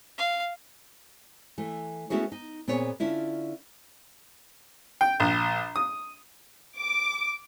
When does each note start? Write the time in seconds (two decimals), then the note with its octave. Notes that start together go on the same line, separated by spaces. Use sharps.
0.18 F5
1.58 E3 A3
2.10 A3 B3 C#4 E4 F#4 G#4
2.32 D#4
2.68 A#2 B3 C4 G#4 C#5
3.00 D3 C#4 D4 E4 F4
5.01 G5
5.20 A#1
5.76 D#6
6.77 D6